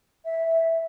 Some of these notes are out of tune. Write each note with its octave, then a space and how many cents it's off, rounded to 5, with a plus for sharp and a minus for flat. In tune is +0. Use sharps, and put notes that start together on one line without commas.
E5 -5